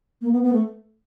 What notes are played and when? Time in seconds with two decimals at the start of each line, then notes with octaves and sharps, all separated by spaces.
0.21 A#3
0.32 B3
0.43 B3
0.53 A3